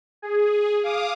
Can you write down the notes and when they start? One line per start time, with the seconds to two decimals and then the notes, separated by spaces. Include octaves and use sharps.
0.22 G#4
0.84 F5 D6 D#6